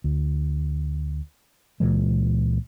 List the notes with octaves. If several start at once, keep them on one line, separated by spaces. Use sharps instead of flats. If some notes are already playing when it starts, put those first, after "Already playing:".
D2
C#2 A#2 E3 G#3